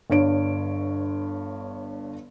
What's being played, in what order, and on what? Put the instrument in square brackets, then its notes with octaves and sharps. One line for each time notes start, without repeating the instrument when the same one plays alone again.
[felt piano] G1 G2 C#5 D7